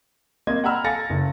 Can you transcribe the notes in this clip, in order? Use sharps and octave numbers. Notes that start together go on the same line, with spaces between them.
A#3 C4 D#5 G#6
F#5 G5 A#5 B5 E6 F6
A4 F5 G#5 A6 A#6 C#7
F#1